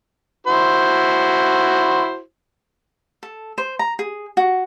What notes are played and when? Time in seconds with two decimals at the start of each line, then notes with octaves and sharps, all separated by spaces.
0.47 E4 F#4 C5
3.23 A4
3.58 C5
3.79 A#5
3.99 G#4
4.37 F#4